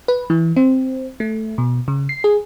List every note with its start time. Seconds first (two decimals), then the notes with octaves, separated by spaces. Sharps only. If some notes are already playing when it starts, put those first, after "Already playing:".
0.08 B4
0.30 E3
0.56 C4
1.20 A3
1.58 B2
1.88 C#3
2.09 C7
2.24 G#4